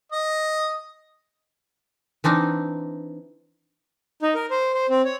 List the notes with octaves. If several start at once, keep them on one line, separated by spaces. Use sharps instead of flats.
D#5
E3 C4 D4 D#4
D#4
A#4
C5
C5
C4
C#5